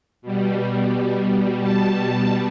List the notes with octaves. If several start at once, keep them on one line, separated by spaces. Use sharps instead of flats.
B2 G3
A5